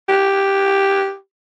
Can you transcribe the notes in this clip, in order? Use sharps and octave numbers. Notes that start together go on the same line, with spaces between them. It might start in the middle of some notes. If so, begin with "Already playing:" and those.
G4